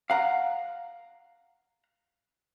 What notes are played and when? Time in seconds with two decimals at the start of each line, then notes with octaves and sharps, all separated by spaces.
0.10 F5 F#5 A#5